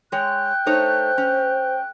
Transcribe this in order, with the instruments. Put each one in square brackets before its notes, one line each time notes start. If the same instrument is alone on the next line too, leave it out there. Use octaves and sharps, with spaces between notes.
[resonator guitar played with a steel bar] G#3 C#5 [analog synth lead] G5 [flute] F#6
[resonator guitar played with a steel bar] A3 D#4 C#5 [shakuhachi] C5
[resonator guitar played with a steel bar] C#4